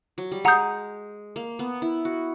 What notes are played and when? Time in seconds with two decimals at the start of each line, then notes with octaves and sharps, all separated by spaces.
0.18 F#3
0.32 G3
0.45 G#3 F#5 A#5 D#6 G6
1.36 A#3
1.59 B3
1.82 E4
2.05 F#4